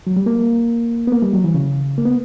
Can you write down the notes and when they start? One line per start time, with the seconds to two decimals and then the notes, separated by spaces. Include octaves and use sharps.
0.07 F#3
0.17 G3
0.26 A#3
1.07 B3
1.12 A#3
1.22 G3
1.33 F#3
1.44 E3
1.54 C#3
1.98 A#3
2.05 B3